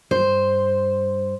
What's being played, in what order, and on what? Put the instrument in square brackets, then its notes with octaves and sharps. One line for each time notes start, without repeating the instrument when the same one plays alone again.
[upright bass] G2 [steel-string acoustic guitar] C5